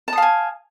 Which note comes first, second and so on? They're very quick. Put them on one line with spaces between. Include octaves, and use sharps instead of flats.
A5 D#6 F5 G#5